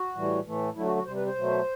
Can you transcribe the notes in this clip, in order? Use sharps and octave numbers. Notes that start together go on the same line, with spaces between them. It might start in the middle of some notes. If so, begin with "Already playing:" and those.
Already playing: F#4
A2 E3 G3
A2 E3 A3
D3 F#3 A3 E4
F#4
F#4
C3 G3 C5
B4
C5
B2 F#3 A3